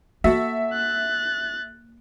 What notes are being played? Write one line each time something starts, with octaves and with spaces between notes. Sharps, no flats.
A#3 F#4 A4 E5 F#5
F#6 A6